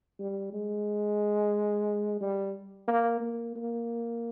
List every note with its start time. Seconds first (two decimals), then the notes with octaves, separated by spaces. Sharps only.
0.20 G3
0.53 G#3
2.21 G3
2.88 A#3
3.21 A#3
3.56 A#3